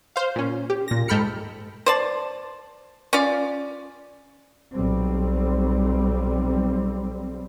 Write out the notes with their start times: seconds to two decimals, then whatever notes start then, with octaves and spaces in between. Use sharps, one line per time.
0.16 C5 F5
0.36 A#2 C#4
0.70 G4
0.88 A#2 A#6
1.08 G#2 A4 G5 B5 F6 C#7
1.86 C5 D5 A5
3.13 C#4 F4 D5
4.73 B1 G3 C4